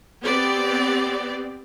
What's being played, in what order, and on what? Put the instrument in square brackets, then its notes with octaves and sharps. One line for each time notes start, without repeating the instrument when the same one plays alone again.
[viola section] B3 C4 G4 D5